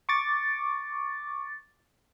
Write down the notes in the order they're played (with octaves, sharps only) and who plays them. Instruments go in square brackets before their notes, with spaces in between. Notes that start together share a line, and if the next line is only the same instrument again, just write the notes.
[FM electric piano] C#6 D6 A6